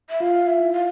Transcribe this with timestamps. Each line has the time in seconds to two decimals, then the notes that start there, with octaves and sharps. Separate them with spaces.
0.09 E5
0.20 F4 F5
0.47 E5
0.60 E4
0.73 F5